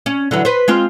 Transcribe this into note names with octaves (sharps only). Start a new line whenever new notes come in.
C#4
D3 E3 F#3
B4 C5
G#3 C4 F4